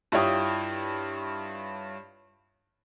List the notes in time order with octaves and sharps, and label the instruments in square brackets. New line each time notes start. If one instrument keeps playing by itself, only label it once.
[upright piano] G2 E4 F4 C#5 G5 D#6